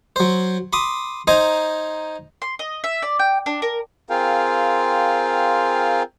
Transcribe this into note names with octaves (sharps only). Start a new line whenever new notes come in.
F#3 C5
B5 C6 D6 D#6
D#4 C5 G#5 A#5
C6
D#5
E5
D5
G5
D4
A#4
C4 F4 G#4 A#4 F5 G5